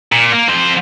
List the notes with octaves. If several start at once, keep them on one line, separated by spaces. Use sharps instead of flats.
A#2
A#3
F2 C5